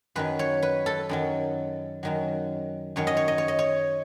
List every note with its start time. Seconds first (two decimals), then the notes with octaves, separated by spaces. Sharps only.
0.15 F#2 D#3 F#3 B4
0.39 C#5
0.62 B4
0.86 A4
1.09 F#2 D#3 F#3
2.03 F#2 D#3 F#3
2.96 F#2 D#3 F#3 C#5
3.07 D#5
3.17 C#5
3.28 D#5
3.38 C#5
3.48 D#5
3.59 C#5